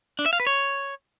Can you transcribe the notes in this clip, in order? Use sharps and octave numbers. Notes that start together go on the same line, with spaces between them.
D4
E5
F5
B4
C#5